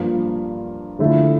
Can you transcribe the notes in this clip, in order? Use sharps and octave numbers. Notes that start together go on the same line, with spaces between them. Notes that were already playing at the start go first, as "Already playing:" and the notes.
Already playing: G2 F3 A#3
D3 F3 A3 E4